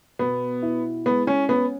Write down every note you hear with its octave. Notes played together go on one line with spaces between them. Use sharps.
B2 B3
E4
G#3 B3
C#4
B3 C#4